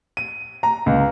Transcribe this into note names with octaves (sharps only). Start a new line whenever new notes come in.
D#7
A#5
C#2